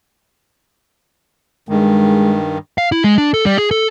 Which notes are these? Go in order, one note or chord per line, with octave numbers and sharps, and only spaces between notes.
G2 D#3 G#3
F5
E4
G#3
D4
A4
G3
G#4
A4